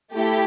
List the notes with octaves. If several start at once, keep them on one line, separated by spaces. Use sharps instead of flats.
A3 E4 G4